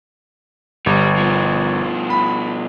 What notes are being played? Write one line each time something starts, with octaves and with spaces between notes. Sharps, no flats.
G1 G3
B2 F3
B5